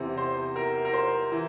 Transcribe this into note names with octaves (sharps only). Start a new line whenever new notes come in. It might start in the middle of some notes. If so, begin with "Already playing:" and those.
Already playing: E2 C3 E3 C5
C5
A#4
A#4
C5
E3